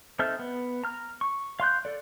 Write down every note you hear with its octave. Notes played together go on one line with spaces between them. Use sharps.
C4 D#4 A4 E5 F6
B3
A#5 F6
C#6
F5 C6 F#6 G6
A4 D5